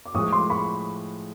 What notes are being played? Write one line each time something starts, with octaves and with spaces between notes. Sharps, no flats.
D6
A2 F3 G#3 C#6 D#6
C6 D6
B5 C#6